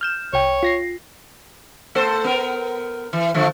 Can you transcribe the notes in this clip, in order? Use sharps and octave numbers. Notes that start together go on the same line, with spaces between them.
F6 G6 E7
C2 C#5 G5
F4 A#6 C7
A3 A4 C5
B3 A#4
E3
D3 F3 A3